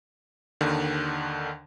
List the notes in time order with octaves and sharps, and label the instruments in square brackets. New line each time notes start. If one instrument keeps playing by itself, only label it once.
[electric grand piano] D#2 D3 D#3